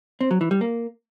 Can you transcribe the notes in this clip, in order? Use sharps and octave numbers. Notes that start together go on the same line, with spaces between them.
C4
F#3
E3
G3
A#3